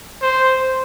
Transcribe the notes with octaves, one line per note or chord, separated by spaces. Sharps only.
C5